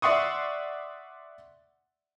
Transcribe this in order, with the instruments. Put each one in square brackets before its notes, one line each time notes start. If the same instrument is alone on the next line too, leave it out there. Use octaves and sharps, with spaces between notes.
[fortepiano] D5 E5 F#5 C6 C#6 D#6